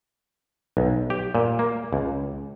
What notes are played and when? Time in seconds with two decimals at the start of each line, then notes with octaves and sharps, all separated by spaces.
0.77 B1
1.10 G4
1.35 A#2
1.59 A#3
1.93 C#2